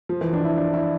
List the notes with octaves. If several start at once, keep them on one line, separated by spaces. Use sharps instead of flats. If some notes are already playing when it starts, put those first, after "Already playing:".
F3
E3
D4
E4
D4
E4